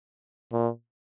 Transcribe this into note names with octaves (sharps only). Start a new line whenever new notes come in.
A#2